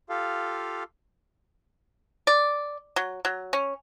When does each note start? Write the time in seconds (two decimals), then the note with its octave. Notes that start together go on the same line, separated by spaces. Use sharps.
0.09 F4 G4 A4 F5
2.27 D5
2.96 F#3
3.25 F#3
3.53 C#4